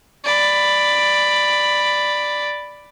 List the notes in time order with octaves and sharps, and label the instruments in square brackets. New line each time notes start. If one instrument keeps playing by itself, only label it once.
[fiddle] D5 B5